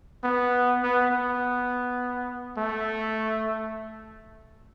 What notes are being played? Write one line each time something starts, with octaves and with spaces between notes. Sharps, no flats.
B3
B3
B3
A3